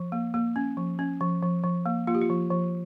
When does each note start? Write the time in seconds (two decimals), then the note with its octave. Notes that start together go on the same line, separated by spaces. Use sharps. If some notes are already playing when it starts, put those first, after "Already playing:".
Already playing: F3
0.12 A#3
0.34 A#3
0.56 C#4
0.77 F3
0.99 C#4
1.21 F3
1.43 F3
1.63 F3
1.86 A#3
2.07 A#3 F4
2.15 G4
2.21 F4
2.30 F3
2.51 F3